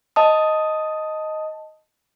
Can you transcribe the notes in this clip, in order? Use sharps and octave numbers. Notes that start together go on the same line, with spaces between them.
D#5 A5 D#6